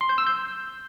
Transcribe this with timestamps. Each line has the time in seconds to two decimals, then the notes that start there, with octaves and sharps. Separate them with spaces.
0.01 C6
0.09 G6
0.18 E6
0.27 G6